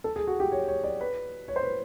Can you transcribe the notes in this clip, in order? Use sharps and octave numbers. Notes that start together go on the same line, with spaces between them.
A4
G#4
F#4
G4
C#5
C#5
D5
B4
C#5
C5
B4